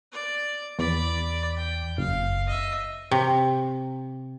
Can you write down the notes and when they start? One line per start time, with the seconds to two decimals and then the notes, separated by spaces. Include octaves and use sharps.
0.12 D5
0.79 E2 D5 B5
1.57 G5
1.98 F#1 F5
2.47 D#5 E5
3.11 C3